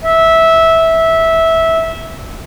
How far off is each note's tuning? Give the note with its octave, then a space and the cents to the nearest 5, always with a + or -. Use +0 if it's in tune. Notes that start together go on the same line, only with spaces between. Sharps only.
E5 -15